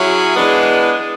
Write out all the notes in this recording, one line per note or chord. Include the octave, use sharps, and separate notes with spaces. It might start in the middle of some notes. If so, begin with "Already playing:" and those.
Already playing: F#3 C#4 E4 G#4
E3 G#3 B3 D4